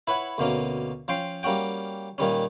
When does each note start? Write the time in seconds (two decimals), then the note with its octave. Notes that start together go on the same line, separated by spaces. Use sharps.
0.07 E4 B4 C#5 F#5
0.38 D2 B2 A#3 C#4
1.08 F3 C#4 G5 C6
1.43 G3 A#3 C#4 F#4 G5
2.18 A#2 D#3 G3 C#4